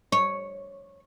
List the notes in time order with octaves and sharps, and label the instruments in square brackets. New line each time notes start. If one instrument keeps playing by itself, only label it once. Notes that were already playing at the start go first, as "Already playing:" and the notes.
[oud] C#5